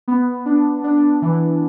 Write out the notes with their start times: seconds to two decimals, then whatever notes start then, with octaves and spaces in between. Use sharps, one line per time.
0.08 B3
0.46 D4
0.84 D4
1.22 E3